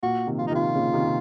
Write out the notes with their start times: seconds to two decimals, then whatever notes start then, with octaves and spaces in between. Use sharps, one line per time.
0.03 A#2 F#4
0.27 C3 D#3
0.39 F3 F4
0.47 D#4
0.51 C3 D#3 F4
0.75 A#2 C#3
0.93 C3 D#3
1.05 C3